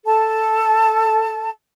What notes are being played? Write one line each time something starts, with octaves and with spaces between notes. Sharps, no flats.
A4 A5